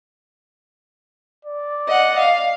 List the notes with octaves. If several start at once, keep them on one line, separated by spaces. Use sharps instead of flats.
D5
D#5 F#5
F5